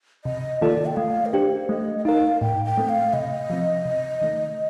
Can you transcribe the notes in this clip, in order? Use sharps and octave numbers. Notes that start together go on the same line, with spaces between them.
C3 D#5
D#3 A#3 F4 A4 D5
G5
A3 F5
A#4
D4 G4 C5
A3 D#5
D#5
D#4 A#4 F5
A2 G5
G5
A3 C4
F5
C3 D#5
F3 C4
C3
D#3 A3